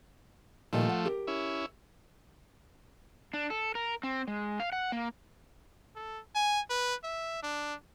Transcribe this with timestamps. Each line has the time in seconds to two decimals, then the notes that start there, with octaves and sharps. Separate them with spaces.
0.73 A#2 D#3 F3 G3 A3
0.89 F#5
1.05 G4 A#4
1.27 C#4 E4
3.34 D4
3.50 A4
3.75 A#4
4.03 C4
4.28 G#3
4.60 F5
4.73 F#5
4.92 A#3
5.96 A4
6.35 G#5
6.70 B4
7.04 E5
7.43 D4